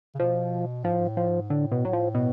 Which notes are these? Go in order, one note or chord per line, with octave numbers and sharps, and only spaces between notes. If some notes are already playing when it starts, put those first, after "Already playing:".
C#3
B2 F3
G#2 F3
A2
G#2
A2
F3
G#2
A2 D3
B2
F#3
F3
B2